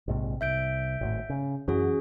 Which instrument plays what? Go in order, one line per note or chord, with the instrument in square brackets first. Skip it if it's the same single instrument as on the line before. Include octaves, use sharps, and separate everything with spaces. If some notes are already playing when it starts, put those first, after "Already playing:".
[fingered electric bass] A#1 G#2 C3
[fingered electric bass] C2 [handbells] E5 G6 D7
[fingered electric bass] G#1 A2
C#3
[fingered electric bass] F#2 E3 [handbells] C#4 F#4 G#4